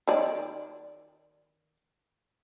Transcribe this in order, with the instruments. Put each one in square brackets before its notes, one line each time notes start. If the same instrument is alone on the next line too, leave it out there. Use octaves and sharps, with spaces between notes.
[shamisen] D#3 D5